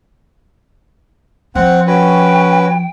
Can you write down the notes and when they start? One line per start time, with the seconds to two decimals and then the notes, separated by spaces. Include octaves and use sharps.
1.55 F3 C4 F#5
1.87 C#4 F#4 B4 G5